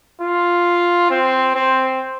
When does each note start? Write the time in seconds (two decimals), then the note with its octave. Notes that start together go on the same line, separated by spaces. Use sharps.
0.21 F4
1.11 C4
1.56 C4